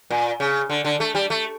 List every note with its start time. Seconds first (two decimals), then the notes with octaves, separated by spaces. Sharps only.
0.10 A#2
0.40 C#3
0.69 D3
0.85 D3
1.00 A3
1.15 G3
1.30 A3